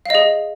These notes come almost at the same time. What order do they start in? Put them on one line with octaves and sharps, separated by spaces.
F5 D#5 G#4